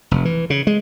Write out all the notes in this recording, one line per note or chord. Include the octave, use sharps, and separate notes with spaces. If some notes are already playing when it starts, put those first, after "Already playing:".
F1
E3
C#3
G#3